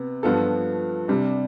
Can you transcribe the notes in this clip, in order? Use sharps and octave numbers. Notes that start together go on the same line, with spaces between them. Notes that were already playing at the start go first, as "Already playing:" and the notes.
Already playing: C3 B3
G2 F3 B3 F4 A4
C3 G3 D4